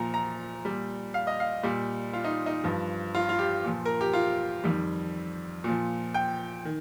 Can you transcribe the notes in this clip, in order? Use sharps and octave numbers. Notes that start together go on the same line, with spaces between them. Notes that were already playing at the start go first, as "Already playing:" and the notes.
Already playing: A#2 F3 A#5
A#5
A#2 G3
F5
D#5
F5
A#2 G3
F4
D#4
D#4
G2 F3
F4
F4
G4
A#2 F3
A#4
G4
F4
F2 D#3 G3
A#2 F3
G5
D#3